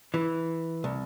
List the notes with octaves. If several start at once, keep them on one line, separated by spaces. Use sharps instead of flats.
E3
C2